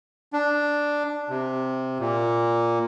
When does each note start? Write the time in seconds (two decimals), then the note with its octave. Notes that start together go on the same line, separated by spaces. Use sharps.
0.33 D4
1.29 C3
2.00 A#2